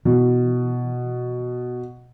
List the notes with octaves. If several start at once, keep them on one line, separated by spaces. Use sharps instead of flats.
B2 E3